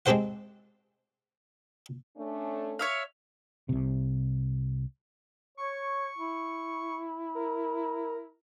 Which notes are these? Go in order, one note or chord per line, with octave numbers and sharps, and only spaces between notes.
G#3 C4 G4 A4 C5 F#5
A3 C#4 D4
C#5 E5 F5
C2 C3
C#5 C#6
E4
A#4